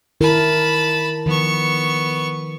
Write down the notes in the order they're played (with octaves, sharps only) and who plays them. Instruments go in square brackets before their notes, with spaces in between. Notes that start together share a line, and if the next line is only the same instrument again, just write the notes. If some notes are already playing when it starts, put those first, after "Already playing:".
[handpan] D#3 E4 A#4 [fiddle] A5 B5
[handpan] D#3 F3 [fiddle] B3 C#6